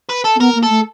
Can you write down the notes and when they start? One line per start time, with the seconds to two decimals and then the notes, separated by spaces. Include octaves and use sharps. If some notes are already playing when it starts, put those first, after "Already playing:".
0.09 B4
0.24 A4
0.36 C4
0.39 B3 A#4
0.55 A#3
0.63 A4
0.70 A3